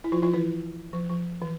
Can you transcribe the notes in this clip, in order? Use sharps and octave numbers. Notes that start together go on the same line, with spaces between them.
E4
F3 F4
F3 F4
E3 E4
F3
F3
E3